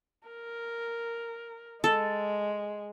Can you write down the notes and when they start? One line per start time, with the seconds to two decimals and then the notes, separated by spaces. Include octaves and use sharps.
0.27 A#4
1.84 G#3 A4